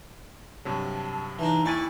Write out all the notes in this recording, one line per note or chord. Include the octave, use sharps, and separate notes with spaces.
G2 C3 F#3 A5
E3 D4 D#4 A5
D#2 E4 D5 G#5 C#6 D6 A6 D#7